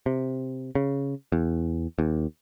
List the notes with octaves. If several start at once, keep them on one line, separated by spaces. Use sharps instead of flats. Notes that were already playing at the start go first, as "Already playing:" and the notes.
C3
C#3
E2
D#2